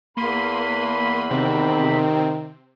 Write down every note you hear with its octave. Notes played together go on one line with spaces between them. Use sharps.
E2 A#3 B5 C6 D#7
C3 D#3 C4